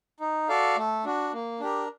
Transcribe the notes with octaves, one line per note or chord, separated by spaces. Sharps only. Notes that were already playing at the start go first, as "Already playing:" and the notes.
D#4
F#4 A4 D5 F5
A3
D4 F#4
A#3
D4 G4 A#4